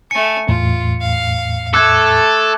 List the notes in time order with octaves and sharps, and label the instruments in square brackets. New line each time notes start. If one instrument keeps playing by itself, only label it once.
[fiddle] A3 G#5 [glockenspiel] C#7
[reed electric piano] E2 A2 [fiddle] F4
[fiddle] F5
[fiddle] A3 [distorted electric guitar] A4 [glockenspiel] D6 F#6 G#6